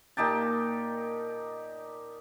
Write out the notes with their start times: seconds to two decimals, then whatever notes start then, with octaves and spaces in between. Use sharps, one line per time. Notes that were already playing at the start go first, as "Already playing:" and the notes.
0.17 A#2 D#4 G4 A5